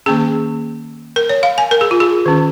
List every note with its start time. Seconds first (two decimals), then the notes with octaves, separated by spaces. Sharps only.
0.06 D#3 A#3 C#4 G#4
1.16 A#4
1.29 C#5
1.43 F5
1.58 G#5
1.71 A#4
1.81 G#4
1.91 F4
2.00 G#4
2.26 D#3 C#4